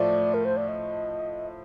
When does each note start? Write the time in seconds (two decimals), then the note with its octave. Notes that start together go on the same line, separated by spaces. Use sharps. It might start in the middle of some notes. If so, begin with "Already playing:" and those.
Already playing: A2 F3 A3 D5
0.34 A#4
0.45 C5
0.57 D5
0.68 D#5